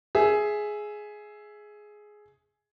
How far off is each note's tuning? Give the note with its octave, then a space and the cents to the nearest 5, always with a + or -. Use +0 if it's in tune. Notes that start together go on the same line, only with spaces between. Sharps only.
G#4 +10 E5 +0